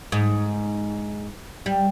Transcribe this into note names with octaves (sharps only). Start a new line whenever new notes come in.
G#2
G3